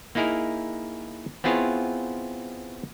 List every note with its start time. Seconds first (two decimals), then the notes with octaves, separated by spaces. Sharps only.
0.15 A#3 D#4 E4 G#4 A#4
1.44 B3 C4 E4 F4 G#4 C#5